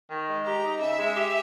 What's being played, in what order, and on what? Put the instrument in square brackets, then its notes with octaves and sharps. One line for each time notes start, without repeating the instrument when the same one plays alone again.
[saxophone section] D#3
G#3
[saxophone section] G4 [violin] A#5
[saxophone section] D#4
[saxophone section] C#3 [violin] E5
[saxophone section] G#3
G4